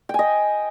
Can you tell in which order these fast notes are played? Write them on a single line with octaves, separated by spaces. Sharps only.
G5 G#5 D#5